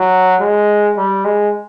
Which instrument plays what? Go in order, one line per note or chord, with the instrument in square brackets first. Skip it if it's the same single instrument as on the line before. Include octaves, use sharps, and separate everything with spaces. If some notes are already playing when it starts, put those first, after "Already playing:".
Already playing: [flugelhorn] F#3
G#3
G3
G#3